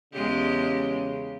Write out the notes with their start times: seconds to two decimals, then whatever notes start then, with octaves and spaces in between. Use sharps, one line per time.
0.13 E2 C#3 G#3 G4